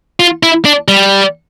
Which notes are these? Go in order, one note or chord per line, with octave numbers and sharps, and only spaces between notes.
F4
E4
D4
G3